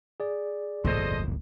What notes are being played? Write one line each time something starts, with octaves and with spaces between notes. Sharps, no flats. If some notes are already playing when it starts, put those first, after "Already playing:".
G#4 D5
D1 G1 F2 A#2 A4 C5 D#5